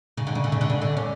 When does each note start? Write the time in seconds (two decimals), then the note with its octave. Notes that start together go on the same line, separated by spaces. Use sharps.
0.17 C#3
0.27 D3
0.35 C#3
0.44 D3
0.52 C#3
0.61 D3
0.70 C#3
0.82 D3
0.97 C#4